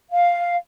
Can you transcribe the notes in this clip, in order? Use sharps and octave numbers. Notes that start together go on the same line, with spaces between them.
F5